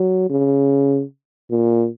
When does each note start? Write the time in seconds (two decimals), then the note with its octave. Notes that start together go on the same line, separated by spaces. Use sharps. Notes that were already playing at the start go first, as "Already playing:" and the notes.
Already playing: F#3
0.30 C#3
1.51 A#2